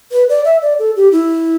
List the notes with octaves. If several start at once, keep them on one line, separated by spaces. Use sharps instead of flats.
B4
D5
E5
D5
A4
G4
E4